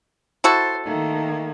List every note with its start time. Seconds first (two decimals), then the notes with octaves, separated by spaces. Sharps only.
0.44 E4 F#4 A4 C5
0.86 D#3 A3 A#3